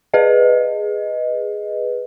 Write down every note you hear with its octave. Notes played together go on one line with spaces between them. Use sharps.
G#4 B4 D#5